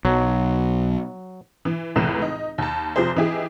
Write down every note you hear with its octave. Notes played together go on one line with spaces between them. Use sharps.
B1 F#3
E3
F1 C#2 A2 E3 B4 E7
D#4
D#2 A5
F1 F3 G4 G#4 C5
E3 D#4 E4 G4 G#4